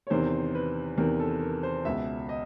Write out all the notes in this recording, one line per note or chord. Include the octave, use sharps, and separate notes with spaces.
C#5
E2 C3 D#3 C5
B4
E2 C3 D#3 A#4
A4
A#4
C5
C#2 B2 E5
D#5